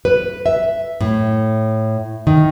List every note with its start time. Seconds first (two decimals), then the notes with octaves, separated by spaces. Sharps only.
0.05 B4
0.46 E5
1.01 A2
2.27 D#3